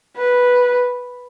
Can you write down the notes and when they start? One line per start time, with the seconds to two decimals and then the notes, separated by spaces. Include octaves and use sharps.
0.17 B4